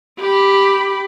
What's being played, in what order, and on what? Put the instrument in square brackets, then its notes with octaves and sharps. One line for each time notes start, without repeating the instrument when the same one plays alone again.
[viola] G4 B5